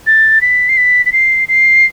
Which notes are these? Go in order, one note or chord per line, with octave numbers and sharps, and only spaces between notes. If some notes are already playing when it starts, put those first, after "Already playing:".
A6
B6
C7
B6
B6
C7
C7